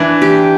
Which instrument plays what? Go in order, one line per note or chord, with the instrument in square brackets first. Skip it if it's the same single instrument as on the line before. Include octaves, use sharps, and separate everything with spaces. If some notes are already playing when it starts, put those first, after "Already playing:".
Already playing: [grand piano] E3 [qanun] D4
[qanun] G4